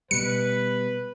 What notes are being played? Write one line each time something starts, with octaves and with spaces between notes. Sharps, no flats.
B2 G3 B4 C#7